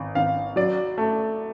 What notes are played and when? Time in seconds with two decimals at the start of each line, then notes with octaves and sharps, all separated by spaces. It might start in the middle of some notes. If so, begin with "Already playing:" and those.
Already playing: G#1
0.15 G#1 F5
0.56 F#3 D5
0.98 A3